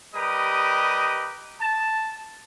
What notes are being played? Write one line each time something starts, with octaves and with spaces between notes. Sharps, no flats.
G3 G4 A#4 B4 D#5 D#6
A5